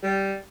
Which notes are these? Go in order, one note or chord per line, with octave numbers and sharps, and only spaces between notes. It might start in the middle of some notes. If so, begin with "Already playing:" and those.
G3